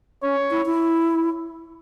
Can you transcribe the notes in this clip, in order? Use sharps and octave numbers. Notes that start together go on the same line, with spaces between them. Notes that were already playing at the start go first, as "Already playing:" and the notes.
C#4 C#5
E4
E4